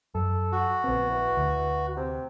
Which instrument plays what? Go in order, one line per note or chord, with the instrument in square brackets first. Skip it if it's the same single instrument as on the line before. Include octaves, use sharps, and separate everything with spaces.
[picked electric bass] F#2 [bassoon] A4
[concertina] F#4
[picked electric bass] A#1 C4 [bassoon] B3
[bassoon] E3
[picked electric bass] D2
[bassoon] C3